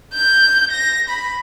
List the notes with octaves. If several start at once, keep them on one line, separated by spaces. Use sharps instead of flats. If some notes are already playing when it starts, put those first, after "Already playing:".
G6
A#6
B5